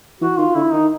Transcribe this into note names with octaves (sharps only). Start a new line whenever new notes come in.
E3 F#4
D#3 F4
D3 E4
D#3 D#4